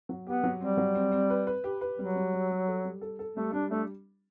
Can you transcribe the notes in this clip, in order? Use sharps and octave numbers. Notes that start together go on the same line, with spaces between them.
F#3
B3 G4
F#3
G3 C4
F#3
C4
C4
B4
B4
G4
B4
F#3 G3
G3
G3
G3
A4
G3
A4
A4
G3 A3
G3 D4
A3 D4